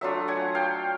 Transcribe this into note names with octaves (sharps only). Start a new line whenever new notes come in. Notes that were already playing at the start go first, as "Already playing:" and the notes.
F#3 A3 D4 F4 E5 F#5
F#5 G#5
F5 G5